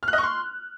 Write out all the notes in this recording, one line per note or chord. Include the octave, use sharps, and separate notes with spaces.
F6
F#6
D#5
C#6
C6